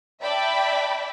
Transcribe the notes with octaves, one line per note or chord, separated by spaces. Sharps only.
D5 E5 G5 A5 B5